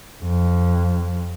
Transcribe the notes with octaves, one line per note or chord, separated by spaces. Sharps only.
F2